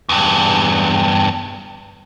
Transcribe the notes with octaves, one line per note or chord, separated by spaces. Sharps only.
E2 G2